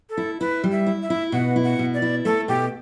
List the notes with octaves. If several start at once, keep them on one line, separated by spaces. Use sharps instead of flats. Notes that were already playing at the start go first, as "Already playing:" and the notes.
A4
E4
E4 B4
G3
E5
E4
E5
E4
B2 F#5
E4
F#5
B2
D5
E4
A3 A4
B2 G4